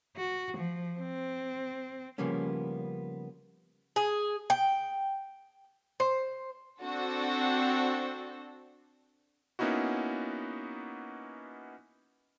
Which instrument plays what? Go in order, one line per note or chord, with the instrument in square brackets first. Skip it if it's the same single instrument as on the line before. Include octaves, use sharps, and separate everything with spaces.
[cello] F#4
F3
C4
[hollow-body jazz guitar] C#3 F3 G3 A#3 B3 C#4
[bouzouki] G#4
G5
C5
[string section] C4 D4 F#4 A4
[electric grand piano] A#3 B3 C#4 D#4 E4 F#4